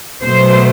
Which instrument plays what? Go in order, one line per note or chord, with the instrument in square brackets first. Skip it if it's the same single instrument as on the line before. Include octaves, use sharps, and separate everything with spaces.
[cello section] B2 F#3 A3 C5